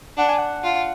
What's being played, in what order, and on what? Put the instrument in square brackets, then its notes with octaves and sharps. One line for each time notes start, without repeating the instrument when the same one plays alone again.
[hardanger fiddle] D4 [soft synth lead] F#5
[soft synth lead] G#5
F#5
[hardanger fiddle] F4